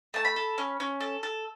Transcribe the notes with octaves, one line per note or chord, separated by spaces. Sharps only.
A3 A5
B5
A4
C#4
C#4
A4
A4